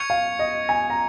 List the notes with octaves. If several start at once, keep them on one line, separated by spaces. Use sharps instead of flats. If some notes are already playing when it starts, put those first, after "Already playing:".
Already playing: C#6 G#6 C#7 F7
F5
D#5
G#5
A#5